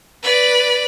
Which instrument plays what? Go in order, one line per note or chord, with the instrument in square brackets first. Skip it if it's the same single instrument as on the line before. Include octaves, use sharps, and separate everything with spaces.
[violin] B4 D5